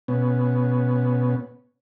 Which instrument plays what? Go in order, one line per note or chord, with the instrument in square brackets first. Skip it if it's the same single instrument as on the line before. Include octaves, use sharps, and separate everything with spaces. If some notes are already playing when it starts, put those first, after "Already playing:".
[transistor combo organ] B2 B3 C#4